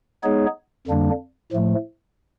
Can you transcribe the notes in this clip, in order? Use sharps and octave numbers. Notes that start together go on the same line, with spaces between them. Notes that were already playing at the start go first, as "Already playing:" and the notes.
G#3 B3 D#4 G#4 C#5
F2 D3 G3 A#3 D4
A2 F3 A3